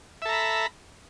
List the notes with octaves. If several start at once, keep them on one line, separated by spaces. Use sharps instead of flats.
A4 E5 A#5 B5